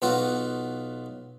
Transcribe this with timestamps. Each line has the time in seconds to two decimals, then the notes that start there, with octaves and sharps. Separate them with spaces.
0.02 B1 B3 F4 F#4